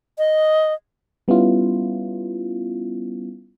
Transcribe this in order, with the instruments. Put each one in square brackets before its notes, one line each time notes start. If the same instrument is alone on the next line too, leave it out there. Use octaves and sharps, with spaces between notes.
[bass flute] D#5
[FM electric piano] G3 B3 C#4 E4 F4